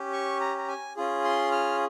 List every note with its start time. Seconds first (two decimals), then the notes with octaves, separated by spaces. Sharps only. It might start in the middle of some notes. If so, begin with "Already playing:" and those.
Already playing: C#4 G4
0.13 C#6
0.40 A#5
0.58 A#5
0.68 G#5
0.96 C#4 F4 G#4
1.24 C6
1.52 F6